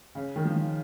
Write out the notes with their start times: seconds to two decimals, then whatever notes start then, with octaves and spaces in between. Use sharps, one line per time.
0.15 C#3
0.36 D#3
0.45 F3
0.56 F3